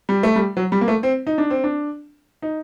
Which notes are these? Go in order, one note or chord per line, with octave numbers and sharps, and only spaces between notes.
G3
A3
G3
F#3
G3
A#3
A3
C4
D#4
D4
C4
D4
D#4